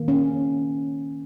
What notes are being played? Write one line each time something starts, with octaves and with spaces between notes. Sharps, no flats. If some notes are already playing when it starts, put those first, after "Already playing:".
Already playing: D#3 A#3
C#4